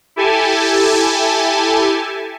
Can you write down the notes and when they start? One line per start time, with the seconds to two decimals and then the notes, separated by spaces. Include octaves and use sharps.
0.16 E4 G4 A4 G#5 A5